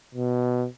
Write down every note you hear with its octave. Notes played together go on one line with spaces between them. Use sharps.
B2